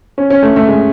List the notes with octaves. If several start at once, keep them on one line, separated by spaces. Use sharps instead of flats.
C#4
C#4
A3
A3
G#3